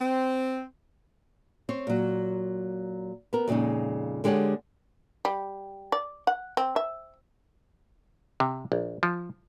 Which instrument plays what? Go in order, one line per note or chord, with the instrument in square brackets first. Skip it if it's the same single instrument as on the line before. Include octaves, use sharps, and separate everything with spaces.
[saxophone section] C4
[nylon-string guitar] C4 C5 C#5
A#2 F#3
B3 A#4
F2 A#2 C#3 G#3 D#4
D3 G#3 G4 C#5 F#5
[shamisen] G3
D5
F#5
C4
E5
[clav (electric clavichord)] C3
A#1
F3